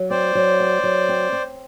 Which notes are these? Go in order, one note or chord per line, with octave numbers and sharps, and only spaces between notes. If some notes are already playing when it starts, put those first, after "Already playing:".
Already playing: F#3
C4 C5 D5
F#3
C4
F#3
C4
C4